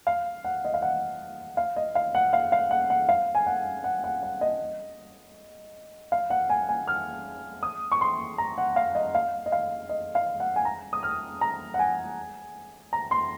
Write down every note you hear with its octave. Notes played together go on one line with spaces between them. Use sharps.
F5
F#5
D#5
F5
F#5
F5
D#5
F5
F#5
F5
F5
F#5
F#5
F5
G#5
F#5
F#5
F#5
F#5
D#5
F5
F#5
G#5
G#5
F6
D#6
C#6
C6
A#5
F#5
F5
D#5
F5
D#5
F5
D#5
F5
F#5
G#5
A#5
D#6
F6
A#5
F#5
G#5
A#5
C6